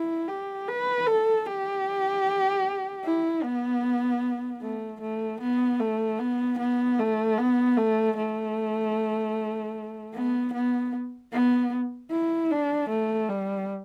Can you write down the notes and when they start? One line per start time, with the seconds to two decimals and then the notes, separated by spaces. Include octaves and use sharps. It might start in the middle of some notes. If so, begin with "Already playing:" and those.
Already playing: E4
0.28 G4
0.68 B4
1.07 A4
1.47 G4
3.04 E4
3.43 B3
4.62 A3
5.01 A3
5.41 B3
5.80 A3
6.20 B3
6.59 B3
6.99 A3
7.38 B3
7.77 A3
8.17 A3
10.14 B3
10.53 B3
11.32 B3
12.11 E4
12.51 D4
12.90 A3
13.29 G3